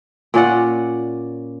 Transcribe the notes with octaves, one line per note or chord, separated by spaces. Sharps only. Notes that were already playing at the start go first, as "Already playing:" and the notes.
A#2 C#4 D5 F#5